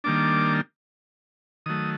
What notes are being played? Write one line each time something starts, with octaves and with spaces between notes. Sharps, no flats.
D#3 G3 A#3 D4 D6
D#3 F#3 A3 D#6